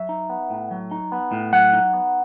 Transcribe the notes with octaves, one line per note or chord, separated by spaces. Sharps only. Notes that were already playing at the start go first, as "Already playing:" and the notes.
Already playing: F#3 E5
D#4
B3
A2
F#3
D#4
B3
A2
F#3 F#5
D#4
B3